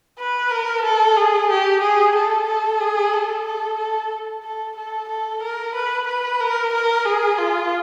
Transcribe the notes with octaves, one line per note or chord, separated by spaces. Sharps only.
B4
A#4
A4
G#4
G4
G#4
A4
A4
G#4
A4
A4
A4
A4
A4
A4
A#4
B4
B4
A#4
A#4
G#4
F4